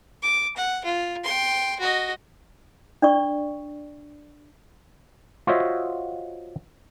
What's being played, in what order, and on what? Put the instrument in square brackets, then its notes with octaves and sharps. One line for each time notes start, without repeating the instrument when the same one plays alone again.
[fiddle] D6
F#5
F4
G5 C6
F#4 D#5
[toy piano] D4 D5 C#6
[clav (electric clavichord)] F4 F#4 C5 C#5 D#5 E5